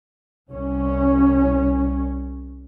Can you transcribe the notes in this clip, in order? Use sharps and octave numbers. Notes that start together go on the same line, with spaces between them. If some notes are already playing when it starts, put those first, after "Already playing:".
C2 C#4